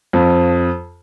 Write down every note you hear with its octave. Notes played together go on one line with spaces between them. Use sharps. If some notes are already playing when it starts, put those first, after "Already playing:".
F2